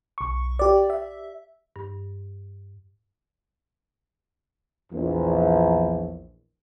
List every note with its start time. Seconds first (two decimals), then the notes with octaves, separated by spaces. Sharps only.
0.18 B1 C#6
0.59 G4 D5
0.90 E5
1.76 G2
4.92 A#1 E2